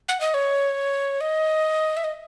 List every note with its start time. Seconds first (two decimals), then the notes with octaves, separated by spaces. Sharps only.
0.09 F#5
0.21 D#5
0.34 C#5
1.21 D#5
1.97 E5
2.04 D#5